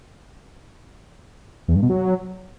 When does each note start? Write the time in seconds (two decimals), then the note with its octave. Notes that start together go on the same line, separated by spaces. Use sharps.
1.68 E2
1.75 G2
1.82 B2
1.90 F#3